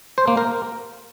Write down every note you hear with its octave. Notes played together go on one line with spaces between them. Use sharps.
C5
A#3
A#4